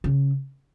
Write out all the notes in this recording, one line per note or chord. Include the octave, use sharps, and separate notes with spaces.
C#3